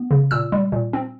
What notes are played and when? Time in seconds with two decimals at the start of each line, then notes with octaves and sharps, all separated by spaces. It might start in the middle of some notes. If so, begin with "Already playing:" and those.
Already playing: B3
0.11 C#3
0.31 A#2 E6
0.52 G3
0.72 A#2
0.93 C4